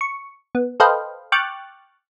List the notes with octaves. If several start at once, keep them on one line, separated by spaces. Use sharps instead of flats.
C#6
B3
A4 B4 C5 D#5 F5 G5
G5 C#6 D6 F6 F#6 A6